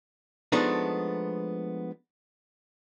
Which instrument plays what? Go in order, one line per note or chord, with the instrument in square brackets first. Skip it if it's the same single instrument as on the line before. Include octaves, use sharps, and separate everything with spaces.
[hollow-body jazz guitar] F3 G#3 A3 B3 D4 D#4